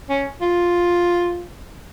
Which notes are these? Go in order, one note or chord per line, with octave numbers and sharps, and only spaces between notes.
C#4
F4